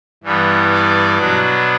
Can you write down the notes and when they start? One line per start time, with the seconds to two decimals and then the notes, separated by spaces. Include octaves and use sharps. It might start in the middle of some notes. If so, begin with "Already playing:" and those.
0.23 G2 E3 G3 B3
0.71 D5
1.18 B2 F#3 B3 D4